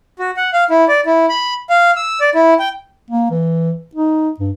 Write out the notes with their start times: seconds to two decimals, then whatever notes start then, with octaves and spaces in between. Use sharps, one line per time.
0.19 F#4
0.37 F#5
0.53 F5
0.70 E4
0.88 D5
1.06 E4
1.29 B5
1.70 F5
1.96 E6
2.21 D5
2.35 E4
2.59 G5
3.11 A#3
3.31 E3
3.95 D#4
4.40 G2